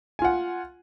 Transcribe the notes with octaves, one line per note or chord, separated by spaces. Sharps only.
F4 F#5 G#5